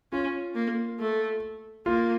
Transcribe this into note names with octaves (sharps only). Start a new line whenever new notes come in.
C#4 F4
A#3
A3
A#3 F4